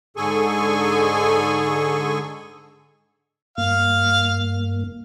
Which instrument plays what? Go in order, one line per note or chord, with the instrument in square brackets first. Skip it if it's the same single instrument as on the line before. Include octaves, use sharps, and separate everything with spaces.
[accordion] G#2 D3 G#4 A4 G#5 C#6
[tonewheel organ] G2 A#3 [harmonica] F5